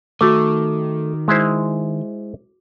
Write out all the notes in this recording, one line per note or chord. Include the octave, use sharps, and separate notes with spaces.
D#3 A3 F#4 D6
G#3 E4 C5